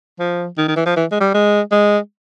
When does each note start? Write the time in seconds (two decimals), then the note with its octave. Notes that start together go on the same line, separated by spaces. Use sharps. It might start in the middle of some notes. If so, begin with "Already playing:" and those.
0.19 F3
0.58 D#3
0.68 D#3
0.76 E3
0.86 F3
0.96 E3
1.11 G#3
1.21 G3
1.34 G#3
1.71 G#3